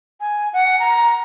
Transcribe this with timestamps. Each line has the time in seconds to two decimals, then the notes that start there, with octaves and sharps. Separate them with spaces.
0.20 G#5
0.53 F#5
0.80 A#5